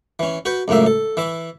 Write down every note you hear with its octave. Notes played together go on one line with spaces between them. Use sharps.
E3 C#4
F#4 B4 F#5 G5
C#2 F#2 A2 A#3 E5
A4
E3 E5 D6